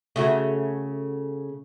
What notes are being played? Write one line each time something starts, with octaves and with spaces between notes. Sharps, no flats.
C#3 A3 F#4